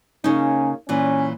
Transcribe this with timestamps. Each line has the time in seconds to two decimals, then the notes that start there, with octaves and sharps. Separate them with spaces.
0.24 C#3 A#3 C#4 D#4
0.89 A#2 E3 C#4